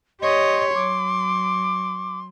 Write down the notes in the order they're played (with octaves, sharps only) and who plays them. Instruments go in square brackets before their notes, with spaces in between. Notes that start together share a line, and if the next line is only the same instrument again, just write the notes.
[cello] G4 C#5 [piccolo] D#5 [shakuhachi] C6
[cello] F#3 [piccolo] D6